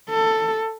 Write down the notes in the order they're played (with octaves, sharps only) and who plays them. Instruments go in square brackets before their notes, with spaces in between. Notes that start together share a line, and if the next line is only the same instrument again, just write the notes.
[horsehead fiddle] A4